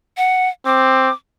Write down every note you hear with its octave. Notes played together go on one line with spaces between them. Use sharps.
F#5
C4 D6